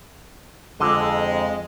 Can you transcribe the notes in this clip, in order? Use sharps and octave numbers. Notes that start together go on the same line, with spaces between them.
F2 D3 G#3